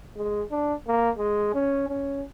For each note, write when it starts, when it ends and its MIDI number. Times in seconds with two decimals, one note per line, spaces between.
0.16 0.43 56
0.51 0.74 62
0.87 1.10 58
1.18 1.50 56
1.54 1.86 61
1.88 2.23 61